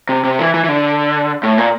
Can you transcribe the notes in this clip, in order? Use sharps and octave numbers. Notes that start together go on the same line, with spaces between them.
C3
C3
E3
E3
E3
D3
A2
A#2